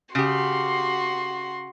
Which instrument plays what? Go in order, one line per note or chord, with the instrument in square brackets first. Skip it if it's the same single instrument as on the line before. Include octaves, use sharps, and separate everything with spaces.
[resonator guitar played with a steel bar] C#3 G4 [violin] F#4 C6